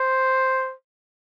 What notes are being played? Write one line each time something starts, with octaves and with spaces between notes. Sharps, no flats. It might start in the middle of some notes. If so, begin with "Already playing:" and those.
Already playing: C5